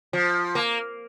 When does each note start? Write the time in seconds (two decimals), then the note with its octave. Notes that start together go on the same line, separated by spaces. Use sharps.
0.13 F3
0.55 A#3